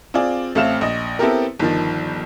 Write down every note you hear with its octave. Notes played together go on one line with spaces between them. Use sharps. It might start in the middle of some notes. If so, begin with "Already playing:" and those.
C4 F4 G#4 D5
A1 A3 C4 F5 F6 E7
A#1 D#5
B3 C4 E4 G4 A4 A#4
G1 D#3 F3